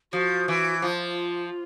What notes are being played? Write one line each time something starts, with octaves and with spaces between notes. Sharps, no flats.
F3 F#4
E3
F3 F4